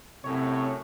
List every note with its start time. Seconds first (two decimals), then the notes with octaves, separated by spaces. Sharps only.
0.24 F#2 A2 C3 C#5